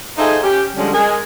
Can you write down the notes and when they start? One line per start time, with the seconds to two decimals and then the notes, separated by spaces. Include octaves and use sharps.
0.18 D#4 F4 G#4 A4 C5 E5
0.43 C#4 G4
0.76 D3 F3 G3 G#3 C#4
0.94 G#3 G#4 A#4